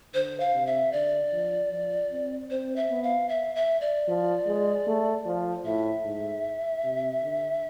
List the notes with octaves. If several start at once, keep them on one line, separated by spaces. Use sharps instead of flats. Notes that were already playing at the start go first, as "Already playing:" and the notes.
D3 C5
F5
C3
E5
D3 D5
F3
F3
C4
C4 C5
E5
B3
F5
E5
E5
D5
F3
G#3
A3
F3
A2 E5
G#2
C3
D3